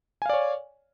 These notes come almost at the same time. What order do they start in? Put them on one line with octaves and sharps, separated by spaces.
G#5 F5 D5 C#5